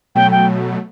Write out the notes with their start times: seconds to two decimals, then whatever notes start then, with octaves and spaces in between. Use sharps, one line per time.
0.15 B2 F#3 A3 G5
0.31 G5